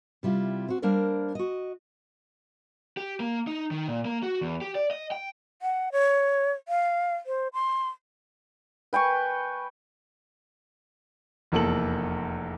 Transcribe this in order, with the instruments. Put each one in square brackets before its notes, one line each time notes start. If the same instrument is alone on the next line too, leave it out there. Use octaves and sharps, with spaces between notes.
[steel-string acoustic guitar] C3 G3 E4 F4
C4 F#4
G3 A#3 D4 A#4 C5 D5
F#4 D#5
[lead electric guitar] G4
A#3
D#4
D#3
A#2
A#3
F#4
E2
G4
D5
D#5
G5
[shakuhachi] F#5
C#5
F5
C5
C6
[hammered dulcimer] B4 G5 G#5 C#6
[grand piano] F1 E2 A#3 A4 F#7